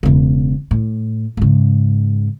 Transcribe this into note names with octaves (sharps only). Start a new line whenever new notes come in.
E1 C#3
A2
G#2 C#3